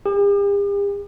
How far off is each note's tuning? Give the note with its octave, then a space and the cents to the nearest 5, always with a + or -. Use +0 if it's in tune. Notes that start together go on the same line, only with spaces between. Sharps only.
G4 +45